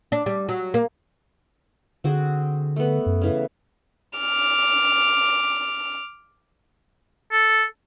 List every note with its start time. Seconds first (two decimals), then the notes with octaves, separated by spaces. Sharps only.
0.12 D4
0.26 G3
0.49 F#3
0.74 A#3
2.04 D3 C4 F#4 G#4
2.76 A3 B3
3.06 F#2
3.22 C#3 E3
4.18 D6 F6
7.32 A4